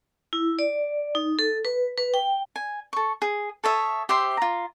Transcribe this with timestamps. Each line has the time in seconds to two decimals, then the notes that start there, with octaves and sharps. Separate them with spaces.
0.33 E4
0.59 D5
1.15 D#4
1.39 A4
1.65 B4
1.98 B4
2.14 G5
2.56 G#5
2.93 A4 C#6
3.22 G#4
3.64 A4 C#5 E5 D#6
4.09 G4 C5 E5 C6
4.37 F4 A#5